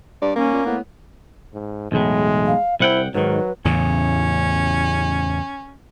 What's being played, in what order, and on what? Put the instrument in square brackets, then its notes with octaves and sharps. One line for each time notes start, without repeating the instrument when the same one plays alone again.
[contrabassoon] G2 [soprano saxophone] D5
[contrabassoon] D#1 [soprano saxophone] A#3 [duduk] C#4
[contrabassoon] A#2
[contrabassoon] A2 [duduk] B3
[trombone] G#2
[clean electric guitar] B1 E2 A2 [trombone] G#3
[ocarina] F5
[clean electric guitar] C2 F#5 G5 [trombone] E4 [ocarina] C5
[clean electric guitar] G#2 D#3 [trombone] F#3 [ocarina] B4
[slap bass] E2 A2 C#3 [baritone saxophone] C#4